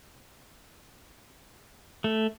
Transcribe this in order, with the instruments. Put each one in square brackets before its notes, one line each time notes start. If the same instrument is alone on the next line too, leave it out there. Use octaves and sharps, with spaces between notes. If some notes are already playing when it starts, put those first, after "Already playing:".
[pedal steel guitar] A3